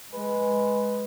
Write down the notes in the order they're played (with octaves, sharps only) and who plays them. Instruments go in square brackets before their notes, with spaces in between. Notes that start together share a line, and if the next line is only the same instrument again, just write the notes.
[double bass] G#3 [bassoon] B4